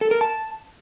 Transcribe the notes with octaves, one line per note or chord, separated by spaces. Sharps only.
A4
A#4
A5